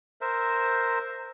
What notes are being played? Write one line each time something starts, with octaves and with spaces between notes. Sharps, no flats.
A#4 C5 E5